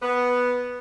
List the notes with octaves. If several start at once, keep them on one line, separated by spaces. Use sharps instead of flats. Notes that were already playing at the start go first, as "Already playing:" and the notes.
B3